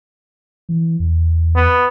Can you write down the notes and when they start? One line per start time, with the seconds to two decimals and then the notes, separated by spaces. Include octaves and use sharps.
0.69 E3
1.00 E2
1.56 B3